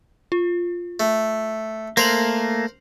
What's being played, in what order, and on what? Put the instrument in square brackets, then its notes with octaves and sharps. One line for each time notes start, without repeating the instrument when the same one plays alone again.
[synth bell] F4
[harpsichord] A3
[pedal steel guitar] A3 A#3 [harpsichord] A#4 C5 [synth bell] C7 F7 F#7